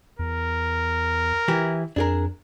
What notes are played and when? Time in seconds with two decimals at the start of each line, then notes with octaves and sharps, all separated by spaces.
0.19 E2 A#4
1.48 E3 E4 G4
1.96 F2 D4 G#4 A#4